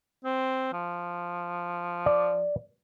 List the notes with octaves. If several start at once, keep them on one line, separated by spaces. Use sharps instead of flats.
C4
F3
D5